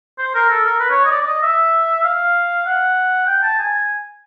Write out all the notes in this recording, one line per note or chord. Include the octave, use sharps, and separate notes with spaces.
C5
A#4
A4
A#4
B4
C#5
D#5
D5
D5
D#5
E5
F5
F#5
G5
A5
G#5